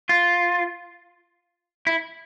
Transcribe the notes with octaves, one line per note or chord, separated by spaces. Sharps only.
F4
E4